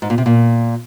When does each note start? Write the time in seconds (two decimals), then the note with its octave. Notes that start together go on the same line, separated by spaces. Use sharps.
0.02 G#2
0.10 A#2
0.18 C3
0.26 A#2